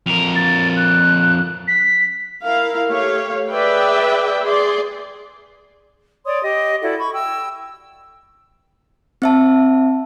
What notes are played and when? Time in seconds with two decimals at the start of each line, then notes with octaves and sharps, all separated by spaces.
0.06 F2 A#4 F7
0.35 A6
0.76 F#6
1.67 B6
2.42 E4 A#4 F5
2.89 A3 G4 C#5 F5
3.52 G#4 B4 D5 E5 G5
4.43 G#4 D5 C6
6.25 C#5 D5 C6 D#6
6.43 G4 D#5
6.81 E4 F#4 A4 D5
6.98 B5 C#6
7.13 G5 E6
9.22 C4 E5 A5